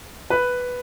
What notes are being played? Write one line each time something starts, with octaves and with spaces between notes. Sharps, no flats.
B4 B5